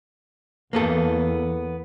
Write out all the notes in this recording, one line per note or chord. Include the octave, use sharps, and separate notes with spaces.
E2 A#3 B3 A4